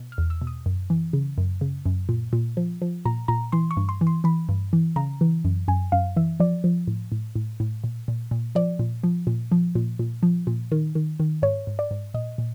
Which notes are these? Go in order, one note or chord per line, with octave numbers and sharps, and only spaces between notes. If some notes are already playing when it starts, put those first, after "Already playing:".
Already playing: B2
F6
E2
E6
B2
D#6
F#2
E3
C#3
F#2
C#3
F#2
A#2
A#2
F3
F3
A#2 A#5
A#2 A#5
E3 C6
C#6
G2
C6
E3
C6
E3 B5
G2
E3
C#3 A#5
E3
F#2
F#2 G#5
F#2 F5
E3 E5
F3 D5
F3
A2
A2
A2
A2
A#2
A#2
A#2
F3 D5
A#2
F3
A#2
F3
A#2
A#2
F3
A#2
D#3
D#3
D#3
G#2 C#5
G#2
D5
G#2
A#2 D#5
A#2